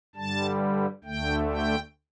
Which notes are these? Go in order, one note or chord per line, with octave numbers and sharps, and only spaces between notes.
G2 D3 G3 A5
D2 D3 A3 G5
G5